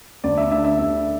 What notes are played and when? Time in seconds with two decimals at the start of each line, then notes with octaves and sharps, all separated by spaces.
0.24 D2 D5
0.38 E5
0.51 D3 A3 D4 E5
0.65 E5
0.78 D2 E5